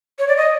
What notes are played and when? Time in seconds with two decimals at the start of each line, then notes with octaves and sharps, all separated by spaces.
0.19 C#5
0.28 D5
0.37 D#5